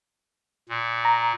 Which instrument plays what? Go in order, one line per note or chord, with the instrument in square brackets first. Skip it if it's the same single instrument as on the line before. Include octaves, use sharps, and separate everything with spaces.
[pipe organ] A#2
[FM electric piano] A#5